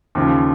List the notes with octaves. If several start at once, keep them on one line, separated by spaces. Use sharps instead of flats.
D#2 C#3 F3